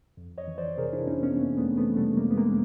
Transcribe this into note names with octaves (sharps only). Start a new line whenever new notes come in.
F2
C#5 D#5
E3
C5 D5
C3 G#4 A#4
D4 E4
F2 C#4 D#4
B3 C#4
F2 A#3 C4
A3 B3
E3
A3 B3
C3 G3 A3
G#3 A#3
F2 B3
G#3 A#3